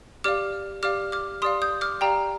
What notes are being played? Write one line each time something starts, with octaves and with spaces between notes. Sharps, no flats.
G4 D5 F5 D6 F6
G4 D5 F5 D6 F6
D6 F6
G4 D5 F5 C6 D#6
D#6 G6
D6 F6
G4 D5 F5 G5 A#5